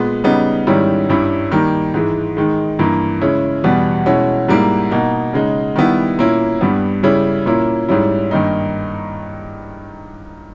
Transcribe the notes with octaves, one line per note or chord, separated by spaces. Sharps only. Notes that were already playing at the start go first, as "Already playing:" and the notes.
Already playing: A#2 G#3 B3
C#3 G3 B3 D#4
G#2 D#3 G3 C#4 E4
G2 G3 C#4 E4
D#3 G3 A#3
G#2 E3 G#3
D#3 G#3 D#4
G2 E3 A#3
C#3 G#3 C#4 E4
E2 B2 G3 B3
B2 G#3 C#4 E4
G#2 G3 A#3 E4
B2 A#3 D#4
C#3 G#3 D#4
D#3 G3 B3 E4
A#2 A#3 C#4 E4
G2 G3 B3
C#3 G3 C#4 E4
A#2 A#3 C#4 E4
G#2 G3 C#4 E4
G2 D#3 A#3 D#4